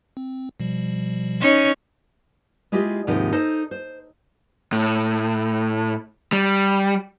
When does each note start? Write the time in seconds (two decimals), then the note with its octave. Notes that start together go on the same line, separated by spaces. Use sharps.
0.17 C4
0.60 B2 F3 G3
1.41 C#4 D#4 C#5
2.72 G#3 E4 F4 G4 D#5
3.07 D#2 G#2 C3 F3 D#4
3.32 D#4 A4 C5 D#5
3.71 C5
4.72 A2
6.33 G3